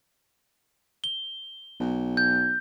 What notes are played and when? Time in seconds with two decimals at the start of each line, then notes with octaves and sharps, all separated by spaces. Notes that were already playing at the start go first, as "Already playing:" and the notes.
1.04 G7
1.80 B1
2.17 G6